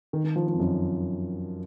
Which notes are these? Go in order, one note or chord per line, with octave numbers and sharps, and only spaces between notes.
D#3
D#3
F3
F3
F2
F#2